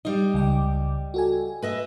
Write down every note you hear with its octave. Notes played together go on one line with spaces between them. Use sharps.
G3 D#4 D#5
C#2 G5 D6
F#4 A4 G#5
B4 D#5 E5